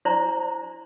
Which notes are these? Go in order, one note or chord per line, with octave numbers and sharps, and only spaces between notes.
D4 E4 C5 D5 A#5 C6